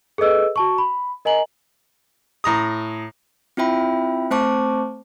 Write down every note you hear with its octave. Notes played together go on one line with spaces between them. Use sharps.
G#4 A4 B4 D#5 E6
F#4 A5 C#6
B5
A#4 D#5 G#5 A#5 F#7
A2 A#5 D#6
C4 E4 F4 E5 G5 B5
A3 C4 C5 A5 C#6 D6